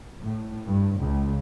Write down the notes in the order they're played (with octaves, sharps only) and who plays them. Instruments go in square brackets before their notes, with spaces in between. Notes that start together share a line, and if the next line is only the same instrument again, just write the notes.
[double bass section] A2
G2
C#2